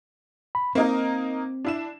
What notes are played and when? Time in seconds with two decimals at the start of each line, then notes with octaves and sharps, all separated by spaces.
0.55 B5
0.75 A#3 C4 D#4 A#4
1.65 D4 E4 E7